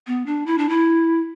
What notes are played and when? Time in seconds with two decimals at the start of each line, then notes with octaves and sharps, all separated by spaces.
0.07 B3
0.26 D4
0.46 E4
0.58 D4
0.69 E4